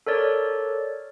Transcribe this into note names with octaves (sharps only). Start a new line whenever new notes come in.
A4 A#4 C#5 D5